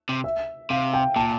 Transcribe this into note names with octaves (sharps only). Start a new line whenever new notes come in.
C3
E5
C3 F5
G5
A#2 A5